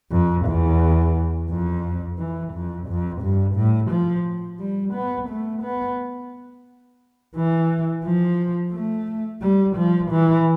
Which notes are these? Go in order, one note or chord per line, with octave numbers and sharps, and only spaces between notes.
F2
E2
F2
E3
F2
F2
G2
A2
F3
G3
B3
A3
B3
E3
F3
A3
G3
F3
E3